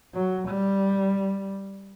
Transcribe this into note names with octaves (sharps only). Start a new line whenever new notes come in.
F#3
G3